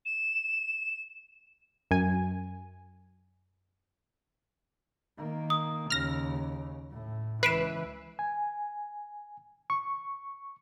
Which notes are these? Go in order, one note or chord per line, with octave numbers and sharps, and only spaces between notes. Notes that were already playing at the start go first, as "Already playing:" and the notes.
E7
F#2 G#5
D#3 A#3
D#6
D#2 C#3 F6 A#6
A2
C#2 E3 B4 C7 D7 E7
G#5
C#6